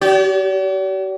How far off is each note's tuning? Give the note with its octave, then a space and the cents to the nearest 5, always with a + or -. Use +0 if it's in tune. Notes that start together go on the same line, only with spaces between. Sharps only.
G4 -45 D5 -45